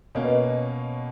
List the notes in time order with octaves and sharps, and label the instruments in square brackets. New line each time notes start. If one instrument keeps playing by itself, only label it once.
[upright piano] B2 A#3 C#4 [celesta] C#5
[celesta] B4 D#5
C#5